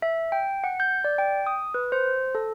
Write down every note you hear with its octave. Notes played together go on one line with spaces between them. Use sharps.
E5
G5
F#5
G6
D5
G5
D#6
B4
C5
A4